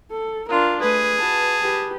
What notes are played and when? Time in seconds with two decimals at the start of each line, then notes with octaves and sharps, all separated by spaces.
0.12 A4
0.49 D4 F4 A#4
0.81 A3 G#4 B4
1.19 F#4 B4 A5
1.61 G4 B4